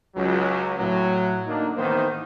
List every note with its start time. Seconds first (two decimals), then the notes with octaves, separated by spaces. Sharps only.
0.16 C#2 F#3
0.78 A2 F#3
1.47 D3 A#3 D4 D#4
1.76 A1 D#3 E3 A#3 B3 C5